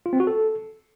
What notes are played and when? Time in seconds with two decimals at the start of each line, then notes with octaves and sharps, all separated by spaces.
0.06 F4
0.13 C4
0.20 F#4
0.27 A4